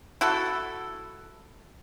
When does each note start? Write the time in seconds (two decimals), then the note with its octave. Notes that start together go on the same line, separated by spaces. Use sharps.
0.21 E4 F#4 A4